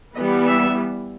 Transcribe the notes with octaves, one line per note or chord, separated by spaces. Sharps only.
E3 G3 B3 D#5
E5